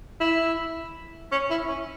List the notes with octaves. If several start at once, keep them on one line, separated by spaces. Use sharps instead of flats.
E4
C#4
E4
C#4